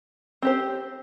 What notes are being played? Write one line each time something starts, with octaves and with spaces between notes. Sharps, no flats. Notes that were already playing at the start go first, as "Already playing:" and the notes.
C4 G4 C5